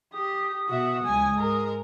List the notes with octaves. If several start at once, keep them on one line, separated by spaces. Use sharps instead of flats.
G4 D#6
B2 F#4 E5
C#2 G#3 G#5
G#2 G#3 A#4